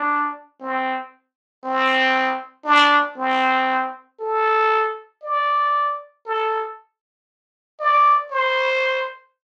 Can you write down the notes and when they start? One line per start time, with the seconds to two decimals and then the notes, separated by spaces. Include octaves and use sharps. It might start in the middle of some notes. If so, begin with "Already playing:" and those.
Already playing: D4
0.61 C4
1.64 C4
2.66 D4
3.17 C4
4.20 A4
5.23 D5
6.26 A4
7.80 D5
8.31 C5